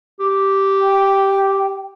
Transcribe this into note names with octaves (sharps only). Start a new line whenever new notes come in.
G4
G5